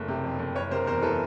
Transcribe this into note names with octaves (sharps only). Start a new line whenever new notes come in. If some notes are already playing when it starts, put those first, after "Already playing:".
Already playing: F#1 A3
C3
F2
F#1
F#1 B4 C#5
C3 A#4 C5
E2 A#4 C5
E3 A4 B4